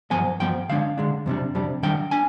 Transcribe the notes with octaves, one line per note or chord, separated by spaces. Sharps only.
G2 F3 B3 G#5
G2 F3 B3 G5
D3 G#3 D4 F5
D3 G#3 D4
F2 C3 G3 D4
F2 C3 G3 D4
D#3 G3 D4 G5
D4 G#5